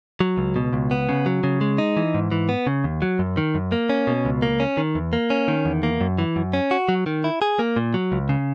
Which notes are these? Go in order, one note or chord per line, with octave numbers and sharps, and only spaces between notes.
F#3
C#2
B2
C#2
B3
C#3
F#3
C#3
G#3
D#4
E3
G#2
E3
B3
C#3
D#2
F#3
F#2
D#3
F#2
A#3
C#4
B2
C#2
A#3
C#4
D#3
E2
A#3
C#4
D#3
E2
A#3
F#2
E3
F#2
C#4
F#4
F#3
D#3
E4
G#4
A#3
A#2
F#3
C#2
C#3